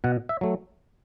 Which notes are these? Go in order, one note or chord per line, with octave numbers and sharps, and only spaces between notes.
B2 F#5
E5
F#3 A3